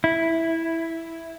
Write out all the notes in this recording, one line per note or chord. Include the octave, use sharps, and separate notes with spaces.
E4